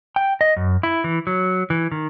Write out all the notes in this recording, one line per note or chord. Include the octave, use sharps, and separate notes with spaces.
G5
D#5
F#2
E4
E3
F#3
E3
D#3